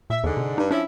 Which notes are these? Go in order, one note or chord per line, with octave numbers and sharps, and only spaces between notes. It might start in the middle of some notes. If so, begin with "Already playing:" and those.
A#2 E5
E2 G#2 D3
C3
G2 D#4
F3 C#4 D4 E4